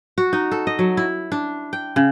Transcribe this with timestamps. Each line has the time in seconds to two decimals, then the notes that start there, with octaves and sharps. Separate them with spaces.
0.18 F#4
0.33 D#4
0.51 A4
0.67 D#5
0.79 F#3
0.97 E4
1.32 D4
1.73 G5
1.96 C#3